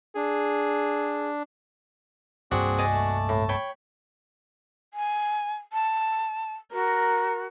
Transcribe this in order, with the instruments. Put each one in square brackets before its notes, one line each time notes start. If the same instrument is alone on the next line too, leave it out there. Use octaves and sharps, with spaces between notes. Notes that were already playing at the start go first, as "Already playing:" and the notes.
[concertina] D4 [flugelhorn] G#4
[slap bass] C2 G2 A#3 [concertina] C4 G#4 [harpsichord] D4 F#4
[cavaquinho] D5 D#5 G#5
[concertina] A3 A5
[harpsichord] A2
[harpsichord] C#5 [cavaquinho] G5 B5
[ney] G#5
A5
[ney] F#4 [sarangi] A#4